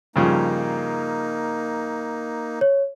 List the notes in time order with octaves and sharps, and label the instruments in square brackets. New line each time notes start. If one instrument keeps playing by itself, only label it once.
[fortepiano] G2 C#3 F3 [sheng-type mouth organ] A#3 D#4
[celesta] C#5